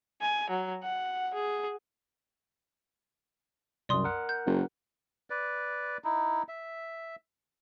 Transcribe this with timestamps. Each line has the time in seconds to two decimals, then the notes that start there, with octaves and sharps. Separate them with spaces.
0.21 G#5
0.50 F#3
0.83 F#5
1.34 G#4
3.89 C2 F#2 D5 C6 D#6
4.04 A#4 F#5
4.29 G6
4.46 F#1
5.30 B4 D5
6.04 D#4 E4
6.48 E5